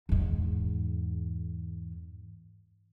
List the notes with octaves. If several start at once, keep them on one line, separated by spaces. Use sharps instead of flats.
E2 G#2